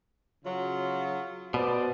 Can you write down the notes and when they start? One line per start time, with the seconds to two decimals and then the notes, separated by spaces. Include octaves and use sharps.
0.45 C#3 F#3 F4
1.54 B2 B4 C5 D5